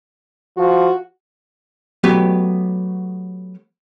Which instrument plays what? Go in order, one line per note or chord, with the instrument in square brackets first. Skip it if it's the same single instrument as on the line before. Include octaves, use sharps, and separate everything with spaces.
[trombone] F3 [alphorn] F#4
[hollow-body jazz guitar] F#3 A3 B3 G4 B4